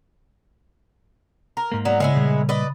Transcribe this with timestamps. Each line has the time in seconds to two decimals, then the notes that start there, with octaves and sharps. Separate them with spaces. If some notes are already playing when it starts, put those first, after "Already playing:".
1.57 A#4
1.72 G#2 A#3
1.85 F#3 B3 D5
2.00 C#3 G#3 B3 E4
2.16 A#2 G3
2.49 B4 D5 D#5